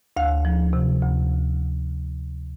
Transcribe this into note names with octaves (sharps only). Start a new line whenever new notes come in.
D2 F5
F3
C3
D2